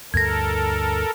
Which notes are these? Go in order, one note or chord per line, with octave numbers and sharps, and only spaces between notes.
D2 G2 A4 A#4 G#6 A#6